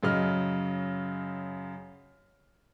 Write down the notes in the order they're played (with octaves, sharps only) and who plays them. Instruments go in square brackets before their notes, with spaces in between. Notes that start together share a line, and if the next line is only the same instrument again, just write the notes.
[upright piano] F#2 C#3 D#5 F6